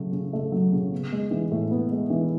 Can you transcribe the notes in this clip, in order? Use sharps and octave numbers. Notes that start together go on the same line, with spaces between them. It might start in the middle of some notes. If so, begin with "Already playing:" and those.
Already playing: C#3 F#3 A3
C#3
A3
F#3
C#3
B3
G#3
E3
A2
B3
G#3
E3